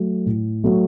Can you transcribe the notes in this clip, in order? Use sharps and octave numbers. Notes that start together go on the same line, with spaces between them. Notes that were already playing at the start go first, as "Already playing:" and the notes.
Already playing: F#3 A3
A2
F#3 A3